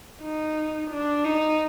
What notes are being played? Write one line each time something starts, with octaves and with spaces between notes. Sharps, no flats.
D#4
D4
D#4